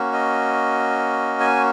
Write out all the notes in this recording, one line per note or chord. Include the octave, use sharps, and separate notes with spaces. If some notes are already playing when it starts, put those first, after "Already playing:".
Already playing: A#3 C#4 F#4
D#5
G#5